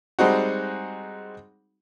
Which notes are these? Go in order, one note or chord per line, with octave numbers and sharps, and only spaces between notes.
G3 G#3 C4 D#4 F#4